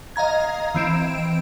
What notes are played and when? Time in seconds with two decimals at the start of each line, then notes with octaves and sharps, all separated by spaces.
0.16 D#5 F5 A#5 G#6
0.75 E3 C4 D7 E7